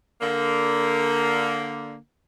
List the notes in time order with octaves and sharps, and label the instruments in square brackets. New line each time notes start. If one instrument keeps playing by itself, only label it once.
[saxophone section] D3 A#3